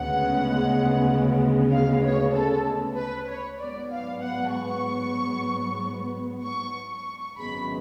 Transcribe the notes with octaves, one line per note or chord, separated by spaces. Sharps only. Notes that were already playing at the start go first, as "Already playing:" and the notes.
Already playing: D2 C#3 G#3 B3 F#5
F5
C#5
A4
B4
C#5
G#2 F#3 B3 D5
F5
F#5
C#6
C#6
C#6
G#1 F#2 C#3 G#3 B3 B5